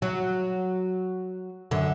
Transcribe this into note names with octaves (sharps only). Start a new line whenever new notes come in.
F#3
F#2 D3